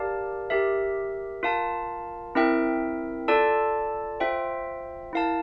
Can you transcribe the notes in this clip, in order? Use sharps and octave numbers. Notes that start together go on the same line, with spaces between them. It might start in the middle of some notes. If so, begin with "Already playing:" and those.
Already playing: G4 A#4 D5 F5 A5
G4 A#4 E5
F4 A#4 F5 A5
C4 E4 A#4 E5 G5
F4 A4 D5 A5
F4 C5 E5 G5
E4 A#4 F5 A5